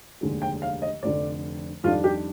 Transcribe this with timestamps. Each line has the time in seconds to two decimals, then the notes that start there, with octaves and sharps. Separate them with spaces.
0.21 F1 D#2 D3 G#3
0.42 G5
0.62 F5
0.82 D#5
1.03 F1 F2 D3 D5
1.83 F2 D#3 G3 D4 F4
2.04 G4